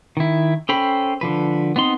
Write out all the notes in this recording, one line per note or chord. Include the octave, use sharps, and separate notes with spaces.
D#3 E4
C#4 A4 C5 G5 B5
D3 F3 B4
B3 C4 D#4 C6